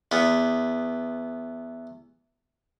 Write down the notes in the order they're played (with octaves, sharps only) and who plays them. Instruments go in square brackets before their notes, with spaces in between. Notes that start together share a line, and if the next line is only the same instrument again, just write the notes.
[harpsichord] E2 B3